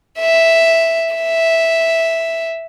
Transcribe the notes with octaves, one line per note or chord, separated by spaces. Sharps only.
E5
E5